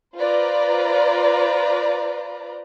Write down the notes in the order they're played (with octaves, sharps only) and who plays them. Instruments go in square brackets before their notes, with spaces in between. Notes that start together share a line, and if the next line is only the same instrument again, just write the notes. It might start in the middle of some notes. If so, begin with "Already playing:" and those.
[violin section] F4 B4 C5 D5 A#5